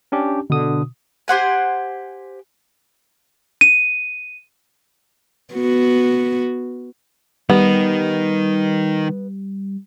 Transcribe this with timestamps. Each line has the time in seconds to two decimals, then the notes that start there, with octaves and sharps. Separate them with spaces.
0.12 C#4 D4 G4
0.50 B2 D3 D#6
1.28 G4 C5 F#5 G#5
3.61 D#7
5.54 B3 F#4
7.50 D#3 G3 B3 D#4